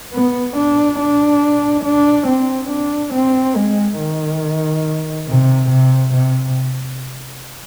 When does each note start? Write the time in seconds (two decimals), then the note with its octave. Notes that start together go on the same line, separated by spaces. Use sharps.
0.13 B3
0.57 D4
0.99 D4
1.85 D4
2.27 C4
2.70 D4
3.14 C4
3.56 G#3
3.99 D#3
5.28 C3
5.70 C3
6.14 C3